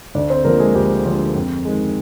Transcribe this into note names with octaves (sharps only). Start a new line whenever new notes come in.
D2 D4 D5
C4 C5
D3 F3 A#3 A#4
G#3 G#4
D2 G4
D3 F3
F2
D#3 G#3